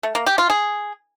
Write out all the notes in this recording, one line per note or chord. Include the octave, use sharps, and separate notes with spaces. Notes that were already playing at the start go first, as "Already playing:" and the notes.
A3
A#3
G4
F4
G#4